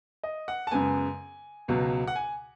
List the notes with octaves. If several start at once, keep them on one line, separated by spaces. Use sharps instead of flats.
D#5
F#5
A5
F#2 C#3 G#3 B3 G#5
C#2 B2 F#3
F#5
G#5